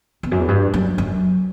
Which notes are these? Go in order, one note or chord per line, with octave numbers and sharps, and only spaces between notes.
E2
F#2
E2
G2
F#2
F#2